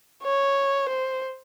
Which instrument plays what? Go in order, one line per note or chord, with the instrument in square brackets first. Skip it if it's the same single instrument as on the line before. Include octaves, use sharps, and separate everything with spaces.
[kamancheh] C#5
C5